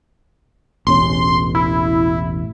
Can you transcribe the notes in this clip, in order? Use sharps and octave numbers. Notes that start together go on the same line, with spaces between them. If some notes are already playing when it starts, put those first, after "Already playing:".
E1 A1 C#4 C6
E4